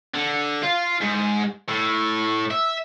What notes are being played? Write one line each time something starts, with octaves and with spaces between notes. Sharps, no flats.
D3
F4
G#2
A2
E5